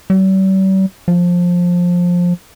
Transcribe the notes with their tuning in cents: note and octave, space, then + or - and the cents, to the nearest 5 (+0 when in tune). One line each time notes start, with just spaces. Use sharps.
G3 -45
F3 +15